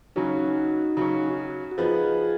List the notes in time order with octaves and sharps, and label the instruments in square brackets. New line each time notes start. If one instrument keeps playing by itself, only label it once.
[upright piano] C#3 F#3 C#4 [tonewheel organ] D#4 F#4
[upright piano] C#3 F#3 C#4
[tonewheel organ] F#4
[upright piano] F3 B3 D#4 [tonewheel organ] F4 G#4